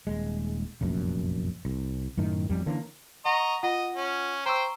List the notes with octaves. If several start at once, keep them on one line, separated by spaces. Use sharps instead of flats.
D#1 G#3
F1 A#1 F#2
C2
F#2 A2 D#3
A1 F2 G3
D3 E3 A#3 C#4
D#5 F#5 A#5 C#6
F4 D#5 F#5
C#4
C5 G5 A#5 C#6 E6